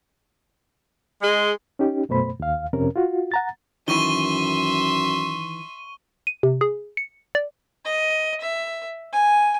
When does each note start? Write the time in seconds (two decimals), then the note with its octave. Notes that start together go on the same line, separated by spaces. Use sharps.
1.22 G#3
1.79 C#4 D#4 G4
2.09 F#2 B2 A3 C5 B5
2.40 D#2 F5
2.73 F2 C3 C#4 A#4
2.96 F4 F#4
3.32 F#5 A#5 A6
3.88 F#2 D#3 E3 E5 C6 C#6 D#7 G7
6.27 D#7
6.43 C3
6.61 G#4
6.97 C#7
7.35 D5
7.85 D#5
8.41 E5
9.13 G#5